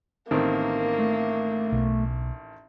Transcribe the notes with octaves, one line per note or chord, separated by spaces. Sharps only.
A1 D#3 A#3 C4
A3
B1